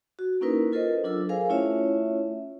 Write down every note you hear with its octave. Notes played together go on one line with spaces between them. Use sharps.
F#4
A#3 C#4 D#4 E4 A#4 B4
F4 A4 A#4 C5 D#5
F#3 D4 F4 A4 D6 E6
G#4 A#4 C5 F5 G#5
A3 C#4 E4 F4 C#5 E5